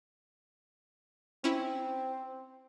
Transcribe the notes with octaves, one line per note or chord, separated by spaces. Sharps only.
C4 C#4 E4